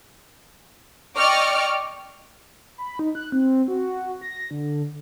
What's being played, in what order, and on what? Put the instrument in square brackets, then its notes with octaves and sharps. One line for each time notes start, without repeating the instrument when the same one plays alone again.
[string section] D5 D#5 G5 C#6 D6 F6
[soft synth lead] B5
D#4
F#6
C4
F#4
A#6
D3